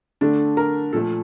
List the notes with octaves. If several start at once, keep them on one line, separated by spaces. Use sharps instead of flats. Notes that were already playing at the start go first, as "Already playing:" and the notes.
D3 A3 D4
A#4
A#2 F3 A3 A4